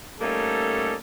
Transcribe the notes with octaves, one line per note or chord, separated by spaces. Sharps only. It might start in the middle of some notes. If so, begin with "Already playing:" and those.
G3 A3 A#3 C#4 D#4 A4